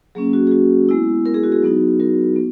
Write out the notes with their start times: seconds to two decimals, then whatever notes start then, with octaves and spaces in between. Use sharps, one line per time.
0.15 F#3 A#3 C#4 G#4
0.33 F#4
0.47 G#4
0.51 F#4
0.89 G#3 B3 E4
1.26 A#4
1.34 G#4
1.44 F#4
1.52 G#4
1.62 F#3 B3 D#4 F#4
2.00 F#4 A#4
2.36 B3